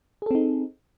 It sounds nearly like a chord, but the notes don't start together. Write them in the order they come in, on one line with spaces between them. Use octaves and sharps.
G#4 A4 C4 D#4